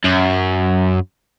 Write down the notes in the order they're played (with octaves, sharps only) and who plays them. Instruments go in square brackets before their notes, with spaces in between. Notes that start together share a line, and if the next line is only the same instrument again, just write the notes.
[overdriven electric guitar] F#2